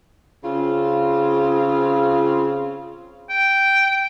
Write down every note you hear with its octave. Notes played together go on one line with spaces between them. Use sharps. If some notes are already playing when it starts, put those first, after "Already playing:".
C#3 C4 F4
G5